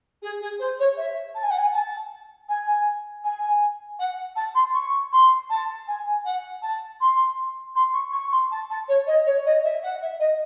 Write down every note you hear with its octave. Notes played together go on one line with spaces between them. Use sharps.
G#4
G#4
C5
C#5
E5
A5
G#5
F#5
G#5
A5
G#5
G#5
F#5
A5
C6
C#6
C6
A5
G#5
F#5
A5
C6
C6
C#6
C#6
C6
A5
A5
C#5
D#5
C#5
D#5
E5
F#5
E5
D#5